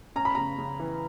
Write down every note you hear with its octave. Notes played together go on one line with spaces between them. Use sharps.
C#4 A#5
B5
C#3 A#5
C#3
E3